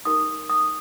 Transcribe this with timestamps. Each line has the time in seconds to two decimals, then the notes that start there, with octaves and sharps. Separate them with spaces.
0.05 D#4 G4 A#4 D#6
0.49 D#6